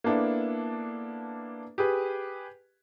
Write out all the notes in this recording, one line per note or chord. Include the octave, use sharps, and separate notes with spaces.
A#3 B3 D4 E4 A4
G4 G#4 B4